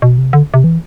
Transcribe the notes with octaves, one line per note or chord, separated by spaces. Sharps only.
B2
C3
D3
C3
E3